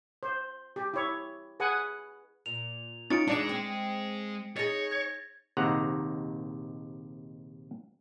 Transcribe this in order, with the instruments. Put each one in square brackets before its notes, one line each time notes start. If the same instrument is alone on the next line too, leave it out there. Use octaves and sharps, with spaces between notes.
[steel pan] C5
G4
E4 C#5
G#4 B4 F#5 G#5
[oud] A#2 [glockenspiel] F7
[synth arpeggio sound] C#4 D#4 F4 [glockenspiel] A6 C#7 D7
[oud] F#2 E3 D#4 [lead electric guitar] G#3 G#4 [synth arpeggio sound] D4 D5 E7
[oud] C4
[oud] D#4 G#4 [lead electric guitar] C#5 [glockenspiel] A6 A#6
[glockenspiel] G#6
[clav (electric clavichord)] A#1 D#2 C3 D#3 F#5 A#5